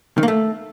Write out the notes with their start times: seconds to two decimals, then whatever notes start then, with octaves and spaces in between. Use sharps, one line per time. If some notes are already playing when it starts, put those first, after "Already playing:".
0.18 D#3
0.23 A#3
0.28 A3